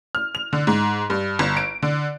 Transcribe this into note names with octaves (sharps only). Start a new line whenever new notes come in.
F6
F7
D3
G#2
G2
G1
D7
D3